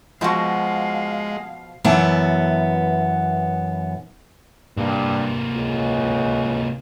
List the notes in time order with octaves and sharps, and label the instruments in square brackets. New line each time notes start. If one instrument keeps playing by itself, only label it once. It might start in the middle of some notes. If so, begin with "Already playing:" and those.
[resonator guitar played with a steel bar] B2 F3 [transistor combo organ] G#3 [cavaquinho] E4 F#4 [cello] F5
[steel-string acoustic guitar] F#2 B2 E3 B3 E5 A5
[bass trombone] G2 [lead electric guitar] C3 A#3
[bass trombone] C#2